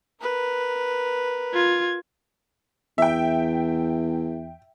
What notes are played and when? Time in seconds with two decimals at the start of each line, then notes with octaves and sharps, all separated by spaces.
0.21 A#4 B4
1.54 F4 G#6
2.98 E2 E5 G5